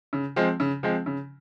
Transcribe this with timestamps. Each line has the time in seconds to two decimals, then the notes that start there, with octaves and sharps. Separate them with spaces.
0.13 C#3
0.36 F3 G#3 C4
0.60 C#3
0.83 F3 G#3 C4
1.06 C#3